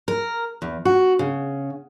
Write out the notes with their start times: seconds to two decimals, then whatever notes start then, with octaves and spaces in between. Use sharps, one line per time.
0.08 A#4
0.62 E2
0.85 F#4
1.19 C#3